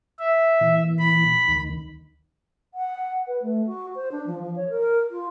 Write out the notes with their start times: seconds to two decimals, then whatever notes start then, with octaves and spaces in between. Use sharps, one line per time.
0.19 E5
0.61 A#2 E3
0.98 B5
1.48 D2 D#3
2.74 F#5
3.27 B4
3.42 A3
3.66 F#4
3.95 C5
4.11 D4
4.26 F3
4.42 F3
4.56 C#5
4.69 A#4
5.10 F4